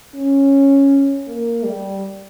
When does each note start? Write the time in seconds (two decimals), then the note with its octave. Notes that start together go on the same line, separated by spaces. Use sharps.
0.15 C#4
1.27 A#3
1.65 G3